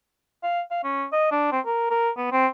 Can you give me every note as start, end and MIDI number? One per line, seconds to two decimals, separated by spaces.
0.43 0.60 77
0.71 0.83 77
0.84 1.05 61
1.12 1.27 75
1.32 1.51 62
1.52 1.60 60
1.65 1.86 70
1.90 2.10 70
2.17 2.28 59
2.32 2.47 60